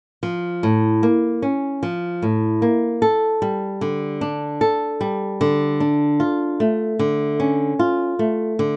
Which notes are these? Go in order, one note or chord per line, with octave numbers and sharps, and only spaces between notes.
F3
A2
A#3
C#4
F3
A2
A#3
A4
G3
D3
D4
A4
G3
D3
D4
F4
A3
D3
C#4
F4
A3
D3